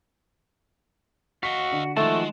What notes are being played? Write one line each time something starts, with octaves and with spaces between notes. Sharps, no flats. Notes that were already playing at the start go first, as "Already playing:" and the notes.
F#4 D#5 F5 B6
D3
D#3 F3 G#3 A3 F#4 A5 E7